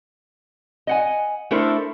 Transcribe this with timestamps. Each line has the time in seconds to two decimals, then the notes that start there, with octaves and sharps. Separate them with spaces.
0.87 D#5 F#5 G#5
1.51 A3 D4 E4 A4 A#4 C5